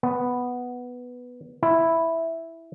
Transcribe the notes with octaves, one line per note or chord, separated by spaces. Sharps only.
B3
E4